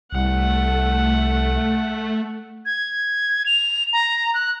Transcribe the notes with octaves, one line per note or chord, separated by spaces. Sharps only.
C2 A3 F#5
G#6
F7
A#5
F#6